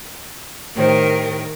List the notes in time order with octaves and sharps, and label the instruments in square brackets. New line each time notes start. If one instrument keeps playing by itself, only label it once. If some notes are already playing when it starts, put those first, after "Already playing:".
[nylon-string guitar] A2 G4 C5 [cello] D#3 A#4